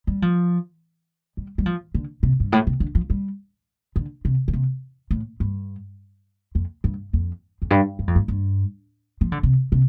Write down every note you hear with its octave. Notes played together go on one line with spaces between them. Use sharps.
G3
F3
G3
G3
F3
D3
C3
G2
A2
C3
D3
F3
G3
D3
C3
D3
C3
A2
G2
F2
G2
F2
F2
G2
G2
F2
G2
G2
F3
D3
C3
C3